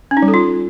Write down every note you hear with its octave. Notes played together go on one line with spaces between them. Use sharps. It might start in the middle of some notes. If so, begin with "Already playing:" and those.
C#4
D#4
G3
A4
F4